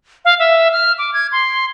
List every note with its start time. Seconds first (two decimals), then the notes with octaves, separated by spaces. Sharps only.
0.25 F5
0.39 E5
0.72 F6
0.98 D6
1.14 G#6
1.32 C6